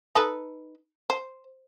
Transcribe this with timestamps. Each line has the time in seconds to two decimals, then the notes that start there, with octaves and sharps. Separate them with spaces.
0.15 D#4 A4 B4
1.10 C5